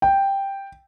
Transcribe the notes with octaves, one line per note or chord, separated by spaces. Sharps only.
G5